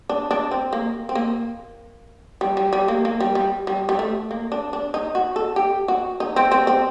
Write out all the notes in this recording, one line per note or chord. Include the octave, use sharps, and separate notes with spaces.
D4
D4
C4
A#3
C4
A#3
G3
G3
G3
A#3
A#3
G3
G3
G3
G3
A3
A#3
D4
D4
D#4
F#4
A4
G4
F#4
D#4
C4
C4
C4